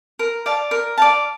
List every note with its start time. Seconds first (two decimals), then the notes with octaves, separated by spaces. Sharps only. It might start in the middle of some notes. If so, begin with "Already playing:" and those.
0.19 A#4
0.46 D5 F5 A5
0.71 A#4
0.98 D5 F5 A5